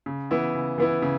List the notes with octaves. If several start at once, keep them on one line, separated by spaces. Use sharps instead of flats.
C#3
E3 B3 E4
C#3
E3 B3 E4
C#3